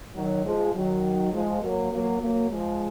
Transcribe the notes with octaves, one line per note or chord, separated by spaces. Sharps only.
D#3 F#3
F3 G#3
D#3 F#3
F3 G#3
F#3 A#3
F#3 A#3
F#3 A#3
F3 G#3